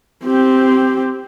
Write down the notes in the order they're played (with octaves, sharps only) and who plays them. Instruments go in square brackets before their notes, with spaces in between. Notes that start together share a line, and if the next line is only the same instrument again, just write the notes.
[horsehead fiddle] C4 G4